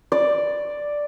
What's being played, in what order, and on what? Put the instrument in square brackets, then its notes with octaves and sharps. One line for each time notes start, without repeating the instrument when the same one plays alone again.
[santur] D5